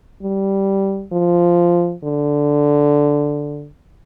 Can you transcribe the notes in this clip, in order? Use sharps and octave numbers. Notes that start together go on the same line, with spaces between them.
G3
F3
D3